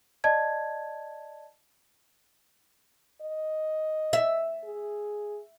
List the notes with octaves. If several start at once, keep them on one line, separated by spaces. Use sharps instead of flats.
D5 D#5 A5 G#6
D#5
E5
G#4